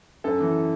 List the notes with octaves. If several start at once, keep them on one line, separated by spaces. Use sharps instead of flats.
F#2 A4
E3